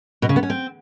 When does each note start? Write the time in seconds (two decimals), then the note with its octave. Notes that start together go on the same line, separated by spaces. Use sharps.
0.22 B2
0.29 C#3
0.36 B3
0.43 C#4
0.50 C4